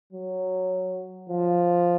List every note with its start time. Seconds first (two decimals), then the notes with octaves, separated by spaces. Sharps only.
0.13 F#3
1.30 F3